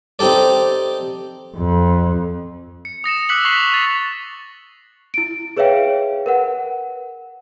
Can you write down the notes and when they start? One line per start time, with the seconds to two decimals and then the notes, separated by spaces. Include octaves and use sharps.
0.19 C4 D#4 G4 A4 D5
1.57 F2
2.85 C#7
3.04 D#6 A#6 C#7 E7
3.29 D6 E6 F#6 B6 C#7 F#7
3.45 C#6 B6 C7 F7 G7
3.72 C#6 A6
5.14 E4 D7
5.57 G#4 B4 C#5 E5 F5 G5
6.26 A#4 B4 F#5